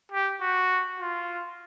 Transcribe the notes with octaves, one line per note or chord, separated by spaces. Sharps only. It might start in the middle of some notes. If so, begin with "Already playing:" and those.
G4
F#4
F4